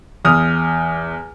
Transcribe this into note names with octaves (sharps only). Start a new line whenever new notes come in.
E2 D#6 F6